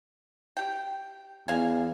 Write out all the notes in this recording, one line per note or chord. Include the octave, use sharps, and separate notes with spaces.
G4 G5
E2 D#5 F5 G#5